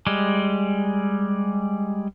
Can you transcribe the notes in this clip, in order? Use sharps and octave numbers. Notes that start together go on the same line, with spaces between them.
G3 G#3